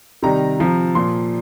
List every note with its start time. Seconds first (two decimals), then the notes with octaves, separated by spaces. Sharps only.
0.23 C3 D#3 G3 A#5
0.60 C3 F3
0.95 A#2 F3 C6